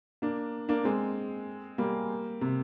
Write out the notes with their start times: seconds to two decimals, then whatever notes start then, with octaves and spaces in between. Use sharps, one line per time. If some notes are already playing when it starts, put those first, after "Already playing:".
0.22 A#3 D4
0.69 A#3 D4
0.84 G#3 C4
1.78 G3 A#3
2.41 C3